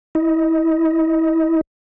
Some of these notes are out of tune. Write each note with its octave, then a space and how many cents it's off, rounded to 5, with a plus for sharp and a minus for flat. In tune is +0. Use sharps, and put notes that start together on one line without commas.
E4 -25 D#5 +15